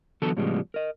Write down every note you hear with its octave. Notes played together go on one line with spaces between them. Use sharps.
D3 E3 F#3 B3 A4 A5
A2 C#3 F3 G3 G#3 B3
A#4 D#5